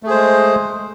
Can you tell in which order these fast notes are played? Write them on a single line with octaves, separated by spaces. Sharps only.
A3 G#4 C5 G#3